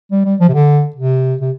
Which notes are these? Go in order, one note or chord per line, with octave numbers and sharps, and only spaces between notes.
G3
G3
F3
C3
D3
C3
C3